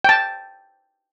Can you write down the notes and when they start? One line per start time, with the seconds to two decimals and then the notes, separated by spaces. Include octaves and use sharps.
0.04 G5 A5